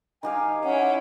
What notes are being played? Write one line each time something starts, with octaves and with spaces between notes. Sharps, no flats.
D#3 G4 F5 G#5
C#4 E4 F#5